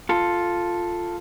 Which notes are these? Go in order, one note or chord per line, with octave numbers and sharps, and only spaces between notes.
F4 A4